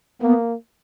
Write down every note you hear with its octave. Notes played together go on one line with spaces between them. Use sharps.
A#3 B3